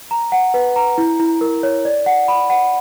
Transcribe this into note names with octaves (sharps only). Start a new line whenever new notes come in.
A#5
F#5
B4
A#5
E4
E4
A#4
C#5
D5
F#5
B5
F#5